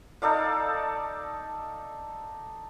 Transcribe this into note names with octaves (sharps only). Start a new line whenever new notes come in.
D#4 A4 D5 F5